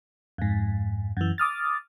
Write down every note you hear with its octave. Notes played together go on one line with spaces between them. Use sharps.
F2 G#2
F#2 E3
D6 D#6 F6 A6